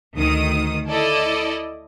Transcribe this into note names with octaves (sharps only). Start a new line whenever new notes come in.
D2 D#3 D#6
E4 A4 D5 D#5